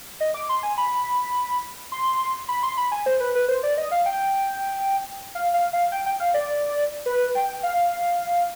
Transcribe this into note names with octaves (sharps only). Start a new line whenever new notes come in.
D#5
D6
C6
G#5
B5
C6
B5
C6
B5
G#5
C5
B4
B4
C5
D5
D#5
F5
G5
F5
F5
F5
G5
G5
F5
D5
B4
G5
F5